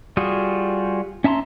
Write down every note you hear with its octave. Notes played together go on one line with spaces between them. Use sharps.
G3 F4 F#4 G#4
C#4 E5 A5 A#5 C6